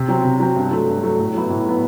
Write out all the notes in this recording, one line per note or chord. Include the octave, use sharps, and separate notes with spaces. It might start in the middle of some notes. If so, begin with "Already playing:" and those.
Already playing: C3
F#3 C4
C3
F#3 C4
G2
F#3 A3
G2
F#3 A3
A2
F#3 B3 E4
A2
F#3 B3 E4